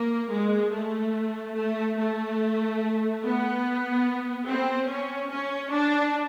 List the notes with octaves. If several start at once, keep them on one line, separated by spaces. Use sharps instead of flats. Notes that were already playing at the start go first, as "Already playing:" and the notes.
Already playing: A#3
G#3
A3
A3
A3
B3
C4
C#4
C#4
D4